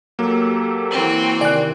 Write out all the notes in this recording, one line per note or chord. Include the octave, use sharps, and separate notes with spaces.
F#3 A#3 G4 A4
E3 C4 F#4
C3 D#3 D5 G#5 F#6